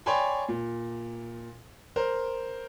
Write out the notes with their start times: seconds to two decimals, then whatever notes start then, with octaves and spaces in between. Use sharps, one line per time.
0.06 C#5 D5 G5 G#5 B5 C6
0.49 A#2
1.96 A#4 C5